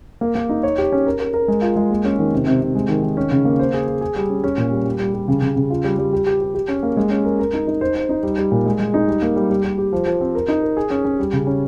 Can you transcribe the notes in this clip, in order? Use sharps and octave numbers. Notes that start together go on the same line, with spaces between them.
A#3
A#3
D#4
C#5
G4
C#4
A#4
A#4
A#4
G#3
F4
G#3
A#3
C#4
D#3
C3
C3
C3
G#3
D#3
D#3
C#4
C#3
A#3
C5
G#4
G#4
G#4
G3
C#4
C#4
A#2
G3
G3
G3
G3
C#3
C#3
C#3
F4
G3
G3
G4
G4
G4
G4
C#4
A#3
G#3
C#4
A#4
A#4
D#4
D#4
C5
C5
D#4
G3
G3
A#2
G#3
G#3
D#4
G3
A#3
G3
G3
G3
G4
F3
F3
C4
A#4
D#4
A#4
G#4
C#4
C#4
G3
C#3
C#4